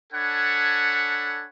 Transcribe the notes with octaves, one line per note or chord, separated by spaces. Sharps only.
D4 A4 C#5 F#5 G#5 B5